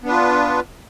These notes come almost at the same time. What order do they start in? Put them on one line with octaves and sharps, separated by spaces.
B3 D4 B4 F4